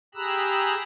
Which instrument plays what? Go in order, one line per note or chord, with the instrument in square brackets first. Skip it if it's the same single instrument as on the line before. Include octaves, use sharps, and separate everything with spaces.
[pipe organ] G4 G#4 A#5 B5 E6 F#6